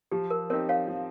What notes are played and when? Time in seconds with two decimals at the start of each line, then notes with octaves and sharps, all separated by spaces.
0.11 F3 G4
0.30 A#4
0.50 C4 D#4 G4 A#4 C#5
0.69 C#5 F5
0.88 F3